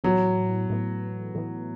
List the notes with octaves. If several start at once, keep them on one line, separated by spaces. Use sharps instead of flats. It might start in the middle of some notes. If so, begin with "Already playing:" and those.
A2 E3 F#3 B3
A2 E3 B3
A2 E3 B3